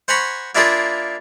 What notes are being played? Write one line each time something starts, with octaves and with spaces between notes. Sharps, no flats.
C5 F#5 G#5 A#5 B5 C#6
A#3 D4 E4 F4 G#4 A#4